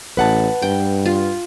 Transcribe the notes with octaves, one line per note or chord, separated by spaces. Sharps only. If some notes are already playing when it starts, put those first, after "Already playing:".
A1 B4 F#5 A5
G2 G5
F4